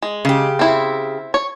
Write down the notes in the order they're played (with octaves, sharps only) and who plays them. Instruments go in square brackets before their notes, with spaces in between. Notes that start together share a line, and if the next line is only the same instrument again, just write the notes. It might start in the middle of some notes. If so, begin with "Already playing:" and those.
[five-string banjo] G#3
[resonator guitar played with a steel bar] C#3 G4
[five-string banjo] C4 E4
C#5